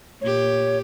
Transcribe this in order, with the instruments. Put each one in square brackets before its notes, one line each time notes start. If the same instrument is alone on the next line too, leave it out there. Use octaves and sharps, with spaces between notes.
[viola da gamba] A#2 G4 [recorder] C#5